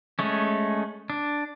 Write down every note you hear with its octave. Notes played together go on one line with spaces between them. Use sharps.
G#3 A3 C#4
D4